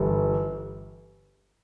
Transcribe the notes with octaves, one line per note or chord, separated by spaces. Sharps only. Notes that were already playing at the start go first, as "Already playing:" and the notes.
Already playing: G1 G2 E3 G3